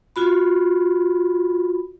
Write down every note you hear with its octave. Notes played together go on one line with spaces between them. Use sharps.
F4 F#4 B5